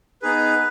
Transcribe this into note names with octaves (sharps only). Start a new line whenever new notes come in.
B3 D#4 G#4 B4